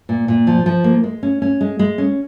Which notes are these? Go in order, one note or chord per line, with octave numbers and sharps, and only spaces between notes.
A#2
A#2
F3
F3
A#3
G#3
C#4
C#4
G#3
G#3
C#4